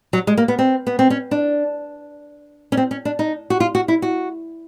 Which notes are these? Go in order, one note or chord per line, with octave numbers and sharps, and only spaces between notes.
F#3
G#3
A#3
B3
C4
B3
C4
C#4
D4
C#4
C4
C#4
D4
D#4
F#4
F4
F#4
E4
F#4